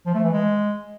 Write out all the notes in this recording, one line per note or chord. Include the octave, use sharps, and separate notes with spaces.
F3
A3
E3
G#3